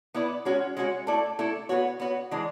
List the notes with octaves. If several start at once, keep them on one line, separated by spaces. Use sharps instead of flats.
B3 E4 B4 D5
G#3 C#4 F#4 C#5
G#3 C#4 F#4 C#5
A3 E4 A4 D5
A3 E4 A4 D5
B3 F#4 C#5
B3 F#4 C#5
E3 G#3 D4